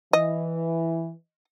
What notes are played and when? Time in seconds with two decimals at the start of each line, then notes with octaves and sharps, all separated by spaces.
0.13 E3 D#5